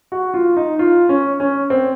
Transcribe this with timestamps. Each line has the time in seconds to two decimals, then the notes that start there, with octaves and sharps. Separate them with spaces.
0.12 F#4
0.34 F4
0.57 D#4
0.79 F4
1.09 C#4
1.40 C#4
1.70 C4